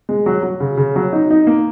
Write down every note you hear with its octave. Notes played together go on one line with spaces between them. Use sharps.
G#3
F#3
F#3
C#3
C#3
F#3
D#4
D#4
A#3